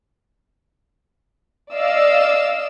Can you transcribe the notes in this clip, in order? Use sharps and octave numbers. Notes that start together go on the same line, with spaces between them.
D5 D#5 F5 E6